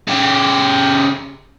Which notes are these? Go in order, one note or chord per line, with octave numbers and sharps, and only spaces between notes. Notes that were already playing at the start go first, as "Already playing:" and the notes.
C#3 G4